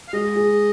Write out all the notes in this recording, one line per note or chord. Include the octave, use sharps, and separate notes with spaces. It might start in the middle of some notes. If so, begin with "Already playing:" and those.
F5
G#3 D#5
G#4